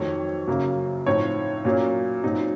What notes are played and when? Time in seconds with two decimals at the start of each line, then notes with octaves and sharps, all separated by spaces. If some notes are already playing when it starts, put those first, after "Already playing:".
Already playing: F2 D#3 F#3 A3 C#5
0.48 F#2 C#3 F#3 A#3
1.06 A2 F3 C4 D#4 C#5
1.65 A#2 F#3 A#3 C#4
2.24 A#2 F#3 C4 D#4